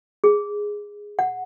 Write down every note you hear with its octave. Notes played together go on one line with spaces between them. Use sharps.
G#4
F#5